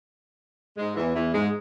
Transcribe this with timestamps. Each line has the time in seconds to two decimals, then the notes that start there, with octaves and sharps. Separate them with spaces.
0.77 G#2 G#3
0.96 E2 E3
1.14 E2 E3
1.33 G#2 G#3